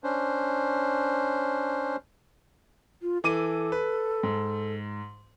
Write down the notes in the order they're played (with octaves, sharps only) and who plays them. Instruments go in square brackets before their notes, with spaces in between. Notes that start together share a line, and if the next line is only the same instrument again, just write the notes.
[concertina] C#4 D4 C5
[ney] F4
[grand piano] E3 D6 D#7 [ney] A4
[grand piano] B4
G#2